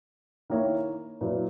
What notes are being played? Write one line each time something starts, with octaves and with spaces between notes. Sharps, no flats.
D#3 A#3 E4 A#4 C#5
A#2 F#3 A#3 E4 B4